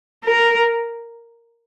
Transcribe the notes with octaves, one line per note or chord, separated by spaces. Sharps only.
A#4